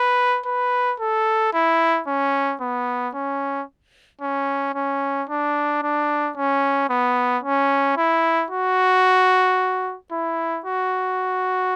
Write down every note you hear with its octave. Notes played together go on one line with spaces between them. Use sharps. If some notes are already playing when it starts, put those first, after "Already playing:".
Already playing: B4
B4
A4
E4
C#4
B3
C#4
C#4
C#4
D4
D4
C#4
B3
C#4
E4
F#4
E4
F#4